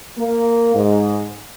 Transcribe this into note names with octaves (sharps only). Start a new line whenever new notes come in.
A#3
G#2